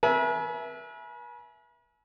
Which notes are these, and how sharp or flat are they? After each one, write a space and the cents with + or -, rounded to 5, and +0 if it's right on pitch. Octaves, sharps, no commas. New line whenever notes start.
B4 -45 E5 +0 G#5 +35